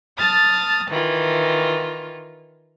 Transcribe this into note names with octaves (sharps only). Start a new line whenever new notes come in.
A5 D#6 F6 A6
D#3 E3 F4